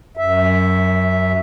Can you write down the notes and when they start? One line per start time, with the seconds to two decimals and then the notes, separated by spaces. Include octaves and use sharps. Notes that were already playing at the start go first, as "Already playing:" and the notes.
0.17 F#2 E5